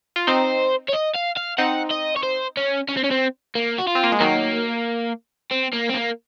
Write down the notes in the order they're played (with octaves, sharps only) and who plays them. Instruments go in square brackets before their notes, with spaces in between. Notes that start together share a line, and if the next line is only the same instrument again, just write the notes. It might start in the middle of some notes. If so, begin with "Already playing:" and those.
[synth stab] F4
[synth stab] C4 D#4 [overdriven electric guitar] C5
[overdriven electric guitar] C#5
D#5
F5
F5
[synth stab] C4 D#4 [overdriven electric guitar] F#5
[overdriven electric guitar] D#5
C#5
C5
C#4
C#4
C4
C#4
C4
A#3
F#4
F4
[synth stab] C4
A#3
G#3
[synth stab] D#3 F#3 [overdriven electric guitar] A#3
[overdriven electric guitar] C4
A#3
C4
A#3